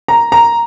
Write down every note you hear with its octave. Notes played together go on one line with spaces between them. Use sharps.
A#5
A#5